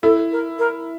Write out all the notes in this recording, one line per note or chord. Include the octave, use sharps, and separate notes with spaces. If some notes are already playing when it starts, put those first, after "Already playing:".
E4 A4
A#4
A#4